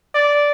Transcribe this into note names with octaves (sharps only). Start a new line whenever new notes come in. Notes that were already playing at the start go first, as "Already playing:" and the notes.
D5